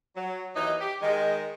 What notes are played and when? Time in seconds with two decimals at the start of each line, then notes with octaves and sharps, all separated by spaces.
0.16 F#3
0.54 D#2 E3 F#3 D#4
0.79 G4
1.01 D#3 G#3